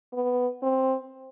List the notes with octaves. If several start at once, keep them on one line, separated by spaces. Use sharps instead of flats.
B3
C4